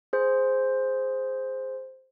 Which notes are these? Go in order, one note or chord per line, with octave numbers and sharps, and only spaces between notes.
G#4 C5